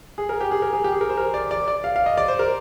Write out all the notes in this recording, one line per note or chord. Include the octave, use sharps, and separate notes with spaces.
G#4
A#4
G4
G#4
A#4
G#4
G4
G#4
A#4
C5
A#4
D5
D5
D5
F5
F5
D#5
D5
C5
A#4